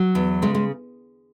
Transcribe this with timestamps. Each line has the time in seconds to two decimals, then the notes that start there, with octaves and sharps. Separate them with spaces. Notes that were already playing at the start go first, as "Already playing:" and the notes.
Already playing: F#3
0.15 E2
0.42 C#3 G#3
0.55 G#3